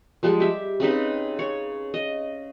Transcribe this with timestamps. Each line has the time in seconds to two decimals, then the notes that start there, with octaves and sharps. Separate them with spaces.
0.23 F3 G3 G#3
0.40 G4 E5
0.80 C#3 C4 D#4 B4
1.39 C#5
1.94 D#5